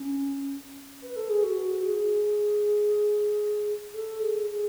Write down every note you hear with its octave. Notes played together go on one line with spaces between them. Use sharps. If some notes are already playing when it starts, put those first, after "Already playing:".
Already playing: C#4
B4
A4
G#4
F#4
G#4
A4
G#4
G#4